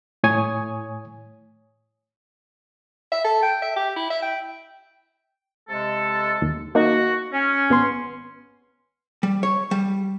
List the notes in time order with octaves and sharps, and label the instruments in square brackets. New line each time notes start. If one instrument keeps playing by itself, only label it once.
[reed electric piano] A2 C#5 G#5 D#6
[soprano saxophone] E5
A4
G5
E5
G4
E4
E5
G5
[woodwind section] C3 G#3 A4
[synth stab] D#2
[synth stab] A#3 D#4 [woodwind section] F#4
[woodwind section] C#4
[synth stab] G#1 B3 C6
[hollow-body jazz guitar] G3
C#5
G3